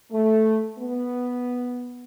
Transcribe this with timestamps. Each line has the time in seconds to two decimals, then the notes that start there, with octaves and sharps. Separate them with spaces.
0.12 A3
0.79 B3